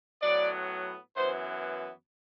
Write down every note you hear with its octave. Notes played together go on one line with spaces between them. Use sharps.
A2 F#3 B3 D5
F#2 E3 B3 C5